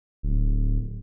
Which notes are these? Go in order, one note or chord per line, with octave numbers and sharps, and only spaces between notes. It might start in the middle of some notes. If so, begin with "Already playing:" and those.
D1